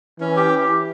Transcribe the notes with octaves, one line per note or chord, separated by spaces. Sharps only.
E3 C#4
G4